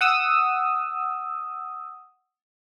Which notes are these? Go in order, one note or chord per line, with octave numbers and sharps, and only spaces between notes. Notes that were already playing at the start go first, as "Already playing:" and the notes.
F#5 D#6 E6